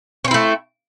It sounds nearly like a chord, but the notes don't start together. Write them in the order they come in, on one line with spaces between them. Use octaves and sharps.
C#4 C4 E4 A3